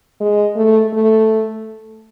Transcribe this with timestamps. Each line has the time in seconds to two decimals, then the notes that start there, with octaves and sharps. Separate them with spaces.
0.20 G#3
0.56 A3
0.93 A3